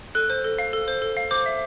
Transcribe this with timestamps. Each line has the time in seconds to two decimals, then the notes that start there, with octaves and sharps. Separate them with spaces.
0.15 A4 F#6
0.30 C5
0.44 A4
0.59 F5
0.73 A4
0.88 C5
1.02 A4
1.17 F5
1.31 C5 D6
1.46 E5